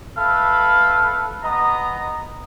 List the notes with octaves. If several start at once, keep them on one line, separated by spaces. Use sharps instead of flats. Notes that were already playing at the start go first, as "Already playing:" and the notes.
A4 B4 E5 F5
B3 D#5 A#5